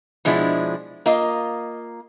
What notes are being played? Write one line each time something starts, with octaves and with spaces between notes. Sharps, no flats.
B2 F3 G#3 D4 E4
A#3 F4 D#5